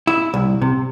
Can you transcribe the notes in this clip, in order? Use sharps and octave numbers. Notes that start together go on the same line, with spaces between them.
E4
C2
C3